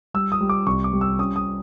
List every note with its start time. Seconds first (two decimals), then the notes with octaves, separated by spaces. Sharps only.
0.14 G3 E6
0.32 D#6
0.41 G3
0.50 D6
0.67 C2 C#6
0.84 D6
0.93 G3
1.01 E6
1.19 C#4 D#6
1.36 D#6